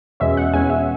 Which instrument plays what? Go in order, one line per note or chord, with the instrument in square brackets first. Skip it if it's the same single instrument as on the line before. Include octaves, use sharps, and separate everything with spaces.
[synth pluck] E2 B2 G#3 C#4 E5
F#5
E2 B2 G#3 C#4 G#5
E5